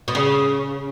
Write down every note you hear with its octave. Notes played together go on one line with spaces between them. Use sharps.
B2
C#3